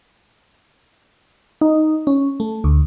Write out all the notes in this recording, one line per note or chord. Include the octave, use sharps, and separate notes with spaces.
D#4
C#4
A3
D2